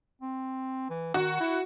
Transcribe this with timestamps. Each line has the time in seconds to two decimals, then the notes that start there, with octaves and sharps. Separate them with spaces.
0.22 C4
0.90 E3
1.14 D#3 F#4
1.40 E4